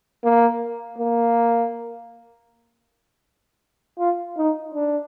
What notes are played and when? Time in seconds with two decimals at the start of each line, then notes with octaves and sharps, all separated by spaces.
0.24 A#3
0.98 A#3
3.98 F4
4.37 D#4
4.74 D4